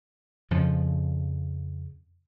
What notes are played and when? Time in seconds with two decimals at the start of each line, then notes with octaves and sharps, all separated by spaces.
0.51 F2 C#3 F3